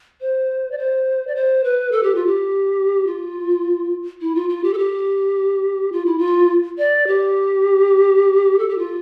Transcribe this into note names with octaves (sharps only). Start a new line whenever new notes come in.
C5
D5
C5
D5
C5
B4
A4
G4
F4
G4
F4
E4
F4
F4
G4
A4
G4
F4
E4
F4
D5
G4
A4
G4
F4